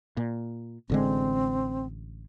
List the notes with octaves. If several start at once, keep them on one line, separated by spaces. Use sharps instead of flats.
A#2
A1 D3 G#3 C4